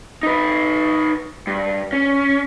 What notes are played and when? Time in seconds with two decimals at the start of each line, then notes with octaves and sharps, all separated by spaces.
0.23 D#4 B4
1.47 G2
1.93 C#4